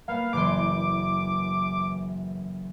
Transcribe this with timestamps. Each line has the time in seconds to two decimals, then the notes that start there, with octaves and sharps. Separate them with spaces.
0.08 A#3 B3 F5
0.33 F#1 E3 C6 D6